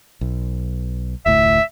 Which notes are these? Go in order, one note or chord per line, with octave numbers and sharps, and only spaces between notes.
B1
F1 D2 A2 E5